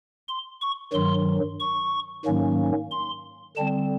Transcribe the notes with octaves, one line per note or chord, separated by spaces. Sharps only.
C6
C#6
G2 D#3 F#3 C6
C#6
G#2 D#3 F#3 A#3 C#4
C6
D3 G3 C4 A5